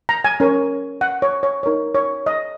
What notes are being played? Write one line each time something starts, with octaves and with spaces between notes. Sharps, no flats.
A#5
G#5
C#4 A#4 C#5
F#5
C#5
C#5
D#4 A#4 C#5
C#5
D#5